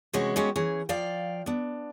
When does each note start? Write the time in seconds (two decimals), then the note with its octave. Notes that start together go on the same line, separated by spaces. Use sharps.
0.13 C3 E3 G#3 C#4 F#4
0.36 G#3 B3 C#4 F#4 G4
0.56 E3 C#4 G#4
0.89 F3 D5 F5 G5
1.46 B3 D4